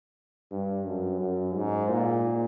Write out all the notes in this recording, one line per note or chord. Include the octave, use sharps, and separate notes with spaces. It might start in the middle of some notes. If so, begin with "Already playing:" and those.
G2
F#2
F#2
G#2
A#2